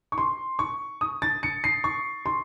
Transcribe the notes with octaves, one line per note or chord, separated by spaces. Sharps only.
C#6
C6
C#6
D#6
A6
C#7
C7
C#6
C6